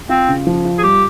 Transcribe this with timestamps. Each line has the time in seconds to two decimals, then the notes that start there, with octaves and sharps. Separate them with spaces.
0.09 C4 F4
0.29 C#3
0.47 F3
0.65 F4
0.78 G#4
0.83 G3 G4